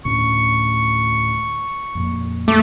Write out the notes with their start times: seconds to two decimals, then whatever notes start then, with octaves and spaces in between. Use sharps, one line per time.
0.05 D2 A2 C#4 C#6
1.95 F2 A#2
2.48 A3 D6